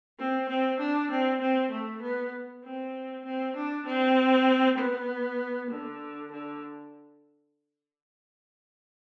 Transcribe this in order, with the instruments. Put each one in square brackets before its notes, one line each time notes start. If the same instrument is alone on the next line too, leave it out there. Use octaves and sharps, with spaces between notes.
[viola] C4
C4
D4
C4
C4
A3
B3
C4
C4
D4
C4
B3
D3
D3